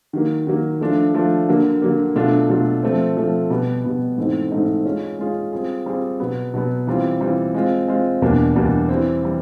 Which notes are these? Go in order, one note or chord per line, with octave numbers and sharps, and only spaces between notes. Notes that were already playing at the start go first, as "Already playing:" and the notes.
D#3 F#3 A#3
D#3 F#3 A#3
F3 A3 D4 F4
F3 A3 D4 F4
D3 F#3 A#3
D3 F#3 A#3
B2 F#3 A3 D4 F4
B2 F#3 A3 D4 F4
F3 A3 C4
F3 A3 C4
B2 G3 B3
B2 G3 B3
G#2 E3 A3 C4 D#4
G#2 E3 A3 C4 D#4
G#3 C#4 F4 G#4
G#3 C#4 F4 G#4
G3 C4 F4 G#4
G3 C4 F4 G#4
B2 F#3 B3
B2 F#3 B3
E3 G3 C4 F4
E3 G3 C4 F4
G#3 C4 F4
G#3 C4 F4
E2 B2 G3 A#3 D4
E2 B2 G3 A#3 D4
E3 G3 C4
E3 G3